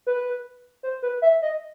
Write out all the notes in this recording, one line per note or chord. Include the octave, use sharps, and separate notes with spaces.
B4
C5
B4
E5
D#5